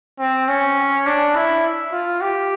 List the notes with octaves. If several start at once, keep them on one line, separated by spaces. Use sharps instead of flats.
C4
C#4
D4
E4
F4
G4